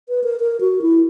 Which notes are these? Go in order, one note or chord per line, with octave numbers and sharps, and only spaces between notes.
B4
A#4
A#4
F#4
E4